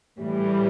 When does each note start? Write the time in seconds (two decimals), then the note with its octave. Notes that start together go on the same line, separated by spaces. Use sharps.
0.18 A2 E3 G3